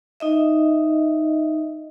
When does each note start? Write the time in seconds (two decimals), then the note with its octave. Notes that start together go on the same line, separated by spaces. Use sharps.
0.20 D#4 D#5 E5